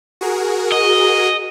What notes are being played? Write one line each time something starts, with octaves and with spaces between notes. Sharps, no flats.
F#4 G#4 A#4
D#5